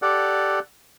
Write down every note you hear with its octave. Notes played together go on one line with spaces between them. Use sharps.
G4 A4 D5 F#5